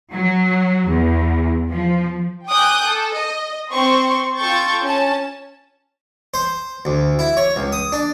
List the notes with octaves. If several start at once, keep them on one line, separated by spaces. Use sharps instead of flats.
F#3
E2
F3
G5 G#5 D6 D#6 F#6 G6
A4
D#5
C4 C5 C6 C#6
F4 A4 G5 C#6 G6 A6
C#4 A5
C5
D2
E4
C#5
C#2
D#6
D4